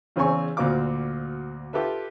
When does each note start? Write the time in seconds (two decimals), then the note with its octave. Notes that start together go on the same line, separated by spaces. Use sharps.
0.16 E2 C#3 C4 C#4 G#5 C#6
0.57 D2 A#2 C4 F#4 F5 D6
1.73 F4 G4 A4 B4 E5